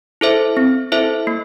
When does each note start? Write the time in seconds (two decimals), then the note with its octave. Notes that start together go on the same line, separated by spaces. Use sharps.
0.21 E4 A4 C5 E5
0.57 C4
0.92 E4 A4 C5 E5
1.27 A#3